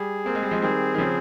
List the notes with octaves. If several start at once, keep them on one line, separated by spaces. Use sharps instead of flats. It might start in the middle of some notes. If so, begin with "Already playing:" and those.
Already playing: G3 G#4
A#3 C4
G#3
G3
F3 G#3
D#3 G3 G#4
D#3
C#3 F3 C4